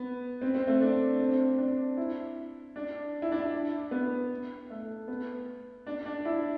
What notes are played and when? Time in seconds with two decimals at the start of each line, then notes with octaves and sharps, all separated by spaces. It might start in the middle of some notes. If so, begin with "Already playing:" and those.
Already playing: B3
0.41 C4
0.55 C4
0.67 A3
0.81 D4
1.20 C4
1.58 D4
1.97 E4
2.76 D4
3.22 E4
3.32 D4
3.40 E4
3.91 B3
4.70 A3
5.08 B3
5.87 D4
6.06 D4
6.25 E4